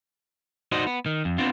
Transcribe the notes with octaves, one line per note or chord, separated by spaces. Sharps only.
D#4 F#4 C5 D5 D#5
B3
D#3
F2
B3 C4 D4 F4